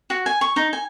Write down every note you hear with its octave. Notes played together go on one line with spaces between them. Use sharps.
F#4
G#5
C#6
D#4
G#5